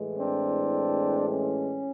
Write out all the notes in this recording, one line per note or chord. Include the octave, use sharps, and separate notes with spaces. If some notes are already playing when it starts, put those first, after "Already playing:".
Already playing: A2 E3 G#3
C4 D4
C#4